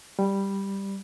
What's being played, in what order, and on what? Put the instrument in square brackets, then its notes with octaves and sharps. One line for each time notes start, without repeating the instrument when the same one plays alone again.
[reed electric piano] G3